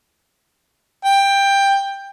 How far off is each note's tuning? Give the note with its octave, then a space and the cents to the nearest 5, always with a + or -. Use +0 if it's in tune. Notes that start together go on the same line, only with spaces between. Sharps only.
G5 +15